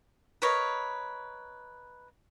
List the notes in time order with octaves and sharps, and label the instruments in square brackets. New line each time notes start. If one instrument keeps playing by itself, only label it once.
[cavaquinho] A#4 B4 C#5 D#5